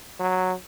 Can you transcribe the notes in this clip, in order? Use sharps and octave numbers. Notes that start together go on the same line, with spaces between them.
F#3